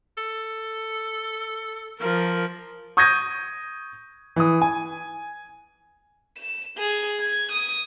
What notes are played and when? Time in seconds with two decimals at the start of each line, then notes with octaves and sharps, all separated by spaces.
0.18 A4
2.00 F3 A#4
2.97 C#6 D#6 G6 G#6 A#6 D#7
4.36 E3 D#6
4.62 G#5
6.37 E7
6.78 G#4
7.20 G#6
7.52 D#6